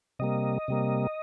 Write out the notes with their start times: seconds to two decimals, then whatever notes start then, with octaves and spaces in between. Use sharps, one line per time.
0.19 C3 G3 A#3 D#5
0.68 C3 G3 A#3